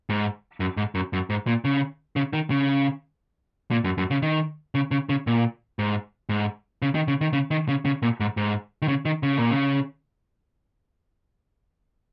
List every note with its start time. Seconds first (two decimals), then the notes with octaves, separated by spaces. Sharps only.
0.09 G#2
0.60 F#2
0.77 G#2
0.95 F#2
1.13 F#2
1.30 G#2
1.47 A#2
1.65 C#3
2.16 C#3
2.33 D#3
2.50 C#3
3.71 A#2
3.84 F#2
3.98 F#2
4.11 C#3
4.22 D#3
4.75 C#3
4.91 C#3
5.09 C#3
5.27 A#2
5.79 G#2
6.29 G#2
6.82 C#3
6.95 D#3
7.08 C#3
7.21 D#3
7.33 C#3
7.51 D#3
7.68 C#3
7.85 C#3
8.02 A#2
8.20 G#2
8.37 G#2
8.82 D#3
8.88 C#3
9.05 D#3
9.23 C#3
9.38 A#2
9.51 C#3